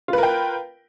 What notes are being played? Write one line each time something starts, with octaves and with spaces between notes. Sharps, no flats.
F4 A#4 B4 G5